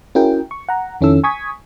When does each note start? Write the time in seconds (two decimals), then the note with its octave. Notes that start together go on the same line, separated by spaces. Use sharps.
0.15 C#4 E4 F#4 G#4 A#4 G5
0.51 C#6
0.69 F#5 A#5
1.01 F2 D#3 C#4 E4 A4 E6
1.24 G#5 C#6 D#6 G#6 B6